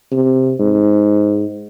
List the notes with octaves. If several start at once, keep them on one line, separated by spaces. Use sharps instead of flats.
C3
G#2